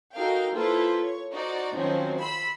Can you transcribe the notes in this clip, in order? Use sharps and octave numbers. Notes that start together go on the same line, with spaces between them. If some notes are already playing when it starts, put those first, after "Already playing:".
D#4 F#4 A4 A#4 F5 G5
A#3 E4 F4 A4 B4 C5
C#5
D#4 F#4 C5 D5
D#3 F3 F#3 C4 C#4 D#4
B5 C6 E6 B6